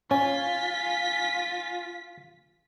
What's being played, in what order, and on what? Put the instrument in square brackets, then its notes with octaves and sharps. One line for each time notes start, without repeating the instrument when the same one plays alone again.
[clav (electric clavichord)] C#4 [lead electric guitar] F4 [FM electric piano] G#5 [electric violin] B6